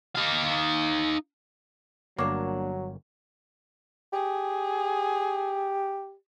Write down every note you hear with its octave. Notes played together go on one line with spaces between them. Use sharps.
D#4 F5
G1 F#3 A#3 D4 A#4 C#5 D6
G4 G#4